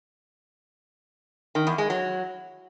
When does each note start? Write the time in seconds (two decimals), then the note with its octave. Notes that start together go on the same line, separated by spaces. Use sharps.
1.55 D#3
1.67 E2
1.78 G#3
1.90 F#3